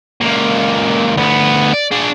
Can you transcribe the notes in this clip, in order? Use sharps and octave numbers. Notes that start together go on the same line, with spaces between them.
C#2 A#2
D2 B3
D5
D4 G#4